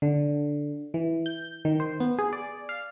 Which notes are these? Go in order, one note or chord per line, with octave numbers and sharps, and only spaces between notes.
D3
E3
G6
D#3
C5
B3
G#4
D5
F5